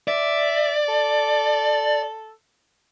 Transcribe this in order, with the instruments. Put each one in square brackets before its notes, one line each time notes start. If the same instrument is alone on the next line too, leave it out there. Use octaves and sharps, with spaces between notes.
[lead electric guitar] D5 [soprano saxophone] E5
[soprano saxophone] A4